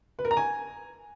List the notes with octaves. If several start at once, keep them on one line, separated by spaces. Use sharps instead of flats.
B4
A#4
A#5
G#5